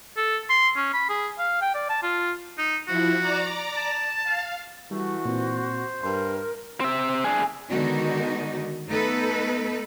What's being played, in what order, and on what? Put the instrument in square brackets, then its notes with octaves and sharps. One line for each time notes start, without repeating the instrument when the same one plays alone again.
[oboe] A4
C6
C#4
B5
G#4
F5
G5
D5
A5
F4
[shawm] D#4
[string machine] F3 E4 [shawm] F#4
[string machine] D5 A#5 D6
[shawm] A5
[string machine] F5
[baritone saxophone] E3 [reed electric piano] G3 [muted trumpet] A3 [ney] F#4
[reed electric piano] A#2 C4 [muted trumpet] C5
[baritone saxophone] G2 [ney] A#4 [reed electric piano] C6
[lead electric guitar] C4 E5
D4 G#4
[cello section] D3 D#3 G#3 B3 D#4 F#4
A3 B3 D#4 A4 B4